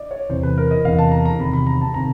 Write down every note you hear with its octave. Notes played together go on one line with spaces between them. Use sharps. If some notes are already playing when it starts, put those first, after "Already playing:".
Already playing: D5 D#5
C#5
E2 C3 E3 C5
B4
A#4
D#5
E2 C3 E3 F5
A5
A#5
A#5
E2 C3 D#3 B5
B5
A#5
A5
C3 D#3 A#5